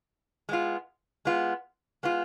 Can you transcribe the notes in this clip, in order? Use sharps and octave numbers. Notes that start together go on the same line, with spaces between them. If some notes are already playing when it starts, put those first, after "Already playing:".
G#3 B3 F4
G#3 B3 F4
G#3 B3 F4